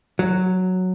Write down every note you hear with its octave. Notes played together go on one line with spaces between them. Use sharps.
F#3